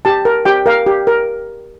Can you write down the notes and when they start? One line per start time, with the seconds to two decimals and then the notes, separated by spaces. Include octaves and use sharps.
0.05 G4 A5
0.25 A#4
0.45 G4 G5
0.66 A#4 F5
0.86 G4
1.07 A#4